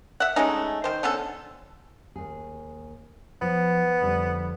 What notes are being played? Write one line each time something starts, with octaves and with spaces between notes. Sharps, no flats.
E5 F#5
G#3 A3 C#4 D#4
D#3 C5
D3 B3 C#4 A4
D#2 G#4
F3 B3
F2 D3 G3